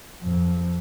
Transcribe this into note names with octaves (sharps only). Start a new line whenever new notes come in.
F2